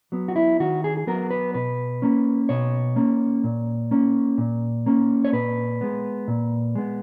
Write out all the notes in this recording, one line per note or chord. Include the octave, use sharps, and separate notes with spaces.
F#3 B3
F#4
E4
D#3 F#4
G#4
G#4
F#3 B3 A#4
B4
B2 B4
A#3 C#4
B2 C#5
A#3 C#4
A#2
A#3 C#4
A#2
A#3 C#4
C#5
A#2 B4
G#3 B3
A#2
G#3 B3